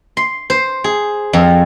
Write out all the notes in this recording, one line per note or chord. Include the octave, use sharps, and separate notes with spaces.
C6
C5
G#4
F2